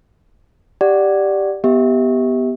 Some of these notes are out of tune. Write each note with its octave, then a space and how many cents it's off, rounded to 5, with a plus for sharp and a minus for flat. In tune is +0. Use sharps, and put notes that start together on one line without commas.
G4 +0 D5 +0 F#5 +0
B3 +0 G4 +0 E5 -35